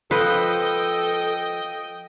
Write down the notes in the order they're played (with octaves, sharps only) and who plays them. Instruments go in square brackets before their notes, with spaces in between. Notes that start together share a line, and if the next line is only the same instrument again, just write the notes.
[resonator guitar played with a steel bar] F3 [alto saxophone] A4 [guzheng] B4 [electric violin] D#5 G5